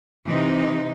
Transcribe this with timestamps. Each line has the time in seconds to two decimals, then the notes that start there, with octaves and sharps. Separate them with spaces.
0.25 C3 E3 D#4